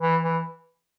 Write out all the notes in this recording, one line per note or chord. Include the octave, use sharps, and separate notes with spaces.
E3
E3